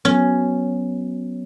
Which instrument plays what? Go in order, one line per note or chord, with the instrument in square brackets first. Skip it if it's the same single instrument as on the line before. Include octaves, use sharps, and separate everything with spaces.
[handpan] F#3 B3 [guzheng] C#4